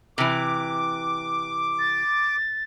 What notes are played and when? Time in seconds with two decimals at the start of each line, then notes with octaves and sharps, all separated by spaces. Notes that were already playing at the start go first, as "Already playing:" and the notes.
0.18 C3 E3 D6
1.79 A6